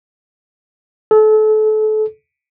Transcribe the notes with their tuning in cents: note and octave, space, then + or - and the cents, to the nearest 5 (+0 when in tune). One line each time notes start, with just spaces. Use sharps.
A4 -30